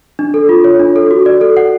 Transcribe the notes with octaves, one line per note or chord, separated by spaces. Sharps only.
D4
A4
F4
C#5
D4
A4
F#4
D5
A4
F#5